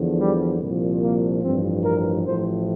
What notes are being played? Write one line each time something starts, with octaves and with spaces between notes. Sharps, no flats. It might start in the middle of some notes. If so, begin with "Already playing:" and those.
Already playing: E2 D3 F3
G3
C2 A#2 F3
A#3
A1 G2 F3 C4
A#4
A1 A2 F3 C5